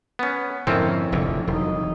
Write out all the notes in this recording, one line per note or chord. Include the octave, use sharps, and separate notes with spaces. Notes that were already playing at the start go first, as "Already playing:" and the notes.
B3 C#4
F2 G#2 D3 C4 C#4 E4 A#4
F1 E2 D3
E1 F#3 D#4